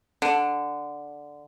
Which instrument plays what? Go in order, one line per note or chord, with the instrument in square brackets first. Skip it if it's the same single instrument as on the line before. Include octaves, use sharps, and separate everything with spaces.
[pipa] D3